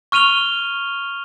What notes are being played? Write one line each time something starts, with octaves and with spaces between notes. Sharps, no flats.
C#6 F6 D#7 F7 G7